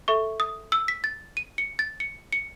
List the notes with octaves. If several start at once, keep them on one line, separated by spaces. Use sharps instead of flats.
A4 E5 C#6
D#6
E6
B6
A6
D#7
C#7
A6
C#7
C#7